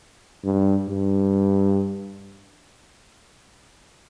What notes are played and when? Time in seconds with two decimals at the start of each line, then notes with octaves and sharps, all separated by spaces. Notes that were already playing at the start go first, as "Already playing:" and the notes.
0.45 G2
0.89 G2